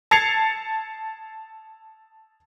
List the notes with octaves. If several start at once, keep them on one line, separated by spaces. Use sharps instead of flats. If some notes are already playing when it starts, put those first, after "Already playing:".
A5 G#6 A6 C7 C#7 F7